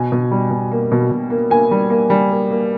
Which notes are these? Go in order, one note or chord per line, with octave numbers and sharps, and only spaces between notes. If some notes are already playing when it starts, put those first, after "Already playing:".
Already playing: B2 G#5
B2
G3
B2
A#3
B2
B2
A#3
A#3 G#5
G3
A#3
G3
A#3
A#3